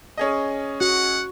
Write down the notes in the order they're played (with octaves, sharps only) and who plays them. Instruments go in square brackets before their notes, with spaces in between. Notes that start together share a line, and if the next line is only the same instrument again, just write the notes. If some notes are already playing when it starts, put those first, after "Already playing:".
[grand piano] C#4 G#4 D#5
[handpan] F#4 [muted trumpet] F#5